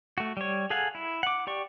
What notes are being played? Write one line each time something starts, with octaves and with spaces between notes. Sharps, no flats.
A3 F#4
G3 C#5
G#4 A4 F5 F#5 G#5
E4
F#5 D6
G4 D5 C#6